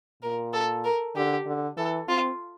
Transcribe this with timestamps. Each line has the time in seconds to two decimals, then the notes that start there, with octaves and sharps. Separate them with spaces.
0.22 A#2 A#4
0.53 A4
0.85 A#4
1.15 D3 G4
1.46 D3
1.77 E3 A4
2.08 C4 F4